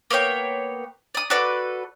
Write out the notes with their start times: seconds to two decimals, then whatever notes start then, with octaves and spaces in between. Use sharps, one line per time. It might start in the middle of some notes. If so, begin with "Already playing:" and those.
0.10 A#3 B3 C#5 G5
1.15 D5 D#6
1.30 F#4 A4 B4 D5